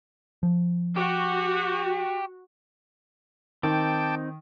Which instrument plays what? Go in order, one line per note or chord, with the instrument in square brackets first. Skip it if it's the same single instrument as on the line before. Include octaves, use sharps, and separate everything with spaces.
[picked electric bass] F3
[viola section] F#4 [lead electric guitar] G4
[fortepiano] D#3 [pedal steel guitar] C4 D#4 [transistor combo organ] G5 A5 D6